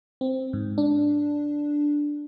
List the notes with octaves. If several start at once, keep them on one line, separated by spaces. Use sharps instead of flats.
C4
G#2
D4